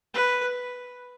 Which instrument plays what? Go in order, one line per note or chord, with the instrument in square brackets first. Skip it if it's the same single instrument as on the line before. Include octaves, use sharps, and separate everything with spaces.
[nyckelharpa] B4